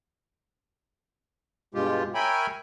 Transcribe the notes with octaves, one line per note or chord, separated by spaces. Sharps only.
G2 B2 G#3 F4 G4
A#4 C#5 E5 G5 G#5 B5